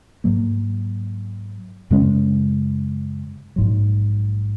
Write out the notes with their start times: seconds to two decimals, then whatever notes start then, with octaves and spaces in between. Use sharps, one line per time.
0.24 G#2 F#3 A#3
1.90 F#2 C#3 G#3 C#4
3.56 A#1 G#2 F#3